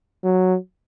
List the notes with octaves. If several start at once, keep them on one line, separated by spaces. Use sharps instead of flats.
F#3